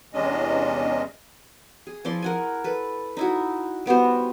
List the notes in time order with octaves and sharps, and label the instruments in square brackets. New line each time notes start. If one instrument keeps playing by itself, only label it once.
[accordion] E2 C3 G#3 C#4 D4 D#5
[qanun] G#4
F3 E4 D5 C6
A#4 F#5 G#5
A4 B4
D#4 E4 F#4
G3 B3 F#4 C5